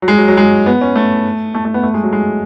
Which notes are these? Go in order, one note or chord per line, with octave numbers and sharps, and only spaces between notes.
F#3
G#3
F#3
F#3
G#3
B3
C#4
A3
A3
A3
B3
A3
G#3
F#3
G#3